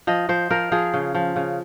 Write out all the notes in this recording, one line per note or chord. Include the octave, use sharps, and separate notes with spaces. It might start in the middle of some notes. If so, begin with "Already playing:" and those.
F3 D#5
F3 C5
F3 A#4
F3 G#4
C#3
F3
C#3